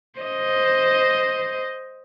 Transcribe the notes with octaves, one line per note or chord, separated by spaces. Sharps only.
C5 D#5